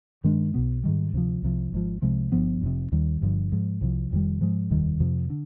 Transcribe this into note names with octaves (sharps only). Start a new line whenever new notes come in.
G2 D#3 G#3 D4
B1 B2 B3
G#2 D#3 G3
D2 C3 F3
C2 C3 F3
G#1 G#2 F3
C2 C3 F3 G#3
G1 G2 F3 B3
F1 F2 C3
D#2 D#3 G3
G1 G2 D3 F3
G#2 F3 G#3
C2 C3 F3
F1 F2 D#3 G3
G#2 F3 G#3
F1 D#2 D#3 G3
F2 C3 F3
D3